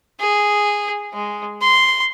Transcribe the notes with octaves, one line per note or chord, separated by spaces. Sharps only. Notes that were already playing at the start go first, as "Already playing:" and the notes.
G#4
G#3
C6